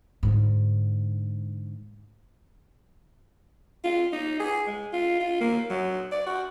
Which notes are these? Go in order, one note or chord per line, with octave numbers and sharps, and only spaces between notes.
G#2 D3
F4
D#4
G#4
G#3
F4
F4
A#3
F#3
D5
F#4